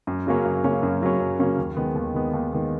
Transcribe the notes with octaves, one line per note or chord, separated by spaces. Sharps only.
F#2
C#3 F#3 A#3 C#4
F#2
C#3 F#3 A#3 C#4
F#2
C#3 F#3 A#3 C#4
F#2
C#3 F#3 A#3 C#4
D#2
D#3 G#3 B3
D#2
D#3 G#3 B3
D#2
D#3 G#3 B3